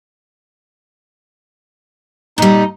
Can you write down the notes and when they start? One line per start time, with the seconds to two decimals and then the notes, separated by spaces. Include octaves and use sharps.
2.38 A#2 G3 D#4